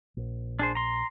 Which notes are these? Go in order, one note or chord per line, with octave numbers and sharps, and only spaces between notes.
A#1
D4 G#4 C5
A#5 C6